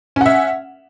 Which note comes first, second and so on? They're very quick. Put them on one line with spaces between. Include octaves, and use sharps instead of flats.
C#4 F#5 E5